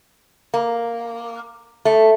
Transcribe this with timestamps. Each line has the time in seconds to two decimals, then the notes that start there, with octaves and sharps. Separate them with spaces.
0.54 A#3
1.85 A3